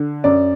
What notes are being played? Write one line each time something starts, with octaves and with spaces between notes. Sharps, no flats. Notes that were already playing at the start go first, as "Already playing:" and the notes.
Already playing: D3
F#2 D5